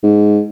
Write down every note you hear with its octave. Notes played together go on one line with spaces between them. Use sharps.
G#2